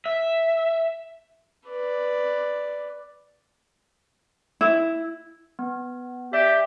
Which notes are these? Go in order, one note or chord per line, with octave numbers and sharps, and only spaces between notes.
E5
B4 D5
E4
B3
G4 D5 E5